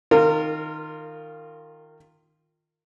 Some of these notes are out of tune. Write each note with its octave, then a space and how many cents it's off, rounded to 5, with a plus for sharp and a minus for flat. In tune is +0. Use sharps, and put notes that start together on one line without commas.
D#3 +0 F4 +0 A#4 -30